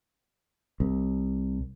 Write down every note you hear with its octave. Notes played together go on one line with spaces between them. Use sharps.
C2